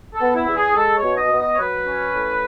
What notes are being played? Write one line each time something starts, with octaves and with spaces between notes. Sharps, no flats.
A4
B3
E4
E2
G#4
G#3 A4
C#5
B2
D#5
B3
D#5
C#5
F#3 B4
C#4
A2